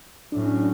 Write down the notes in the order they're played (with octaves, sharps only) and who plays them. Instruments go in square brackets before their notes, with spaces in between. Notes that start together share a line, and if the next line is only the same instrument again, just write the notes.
[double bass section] A2 F#3 C#4 [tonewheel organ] D4